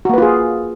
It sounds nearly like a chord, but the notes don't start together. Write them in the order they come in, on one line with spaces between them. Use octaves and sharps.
F#4 A#3 B4 F4 G#4